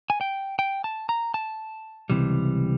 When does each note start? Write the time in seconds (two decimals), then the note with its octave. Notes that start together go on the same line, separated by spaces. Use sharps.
0.10 G#5
0.21 G5
0.59 G5
0.84 A5
1.09 A#5
1.34 A5
2.10 C#2 C3 E3 G3